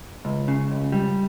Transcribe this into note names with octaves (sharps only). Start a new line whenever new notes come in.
C#2
C#3
C#2
G3